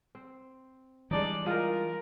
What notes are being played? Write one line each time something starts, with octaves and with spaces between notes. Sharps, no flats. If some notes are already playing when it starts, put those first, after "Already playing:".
C4
E3 G3 G#3 D4 D#4 D5
G#3 D#4 F4 A#4